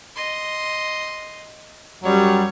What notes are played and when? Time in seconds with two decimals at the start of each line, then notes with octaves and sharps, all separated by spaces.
0.16 D#5 C6
2.04 F#2 F#3 G3 C#5